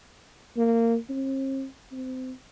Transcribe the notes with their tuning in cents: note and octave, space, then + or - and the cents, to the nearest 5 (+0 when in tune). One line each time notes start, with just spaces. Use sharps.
A#3 -20
C4 +45
C4 -25